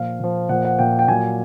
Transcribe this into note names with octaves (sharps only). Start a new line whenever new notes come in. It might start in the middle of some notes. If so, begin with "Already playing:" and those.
Already playing: A#2 F3 F5
A#2 F3
A#2 F3 F#5
F#5
A#2 F3 G5
G5
A#2 F#3 G#5